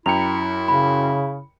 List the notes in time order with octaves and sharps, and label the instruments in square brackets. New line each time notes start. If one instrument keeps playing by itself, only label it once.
[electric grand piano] F#2 G5 C#7 [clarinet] E4 [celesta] A#5 F7
[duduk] C#3 [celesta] B5